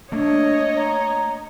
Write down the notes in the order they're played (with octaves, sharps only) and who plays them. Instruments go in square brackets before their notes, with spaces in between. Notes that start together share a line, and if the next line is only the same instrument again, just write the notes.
[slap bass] A3 A#3 [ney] D4 [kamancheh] C#5 D#5
[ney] A#5